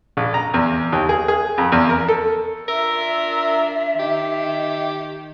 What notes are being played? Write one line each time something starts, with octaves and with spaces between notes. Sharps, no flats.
A#1
A#5
E2
D#2
G#4
G#4
F2
E2
A#4
A4
D4 F4 A#4 E5 E6
D#3 G4 D#5